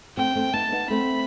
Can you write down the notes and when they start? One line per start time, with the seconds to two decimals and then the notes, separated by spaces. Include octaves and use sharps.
0.17 A3 C4 G5
0.35 A3 C4
0.54 B3 D#4 A5
0.72 B3 D#4
0.90 A3 C4 B5